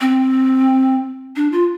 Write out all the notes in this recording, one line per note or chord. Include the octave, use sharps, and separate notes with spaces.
C4
D4
F4